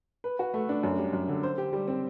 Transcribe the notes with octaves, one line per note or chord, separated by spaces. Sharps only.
B4
F#4
A3
D4
F#2
G3
F#2
D3
C5
G4
G3
C4